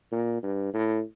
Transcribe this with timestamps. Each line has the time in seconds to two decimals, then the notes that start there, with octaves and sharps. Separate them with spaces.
0.12 A#2
0.43 G2
0.74 A2